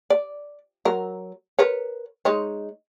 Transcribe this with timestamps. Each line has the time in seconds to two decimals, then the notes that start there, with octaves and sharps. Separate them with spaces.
0.10 D5
0.85 F#3 A#4
1.59 A#4 B4 C#5
2.25 G#3 D#4 C#5